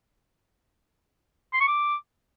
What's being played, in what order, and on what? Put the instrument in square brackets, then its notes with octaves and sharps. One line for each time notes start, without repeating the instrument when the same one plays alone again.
[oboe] C6
C#6
D6